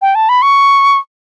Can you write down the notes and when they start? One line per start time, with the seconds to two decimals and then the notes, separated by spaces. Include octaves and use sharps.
0.02 G5
0.15 A5
0.29 B5
0.42 C#6